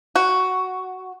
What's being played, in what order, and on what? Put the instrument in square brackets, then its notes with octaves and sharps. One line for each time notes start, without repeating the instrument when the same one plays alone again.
[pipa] F#4